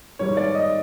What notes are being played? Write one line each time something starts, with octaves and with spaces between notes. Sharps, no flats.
G#2 D#3 G3 C#5
D5
D#5